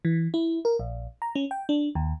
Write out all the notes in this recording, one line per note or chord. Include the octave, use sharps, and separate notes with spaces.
E3
E4
A#4
A#1
A#5
C#4
G5
D4
D#2